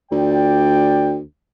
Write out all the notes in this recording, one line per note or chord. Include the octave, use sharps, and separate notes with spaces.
D2 F4 D5 G5